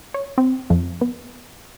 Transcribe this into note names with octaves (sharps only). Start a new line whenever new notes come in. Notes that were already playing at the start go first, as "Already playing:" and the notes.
C#5
C4
F2
B3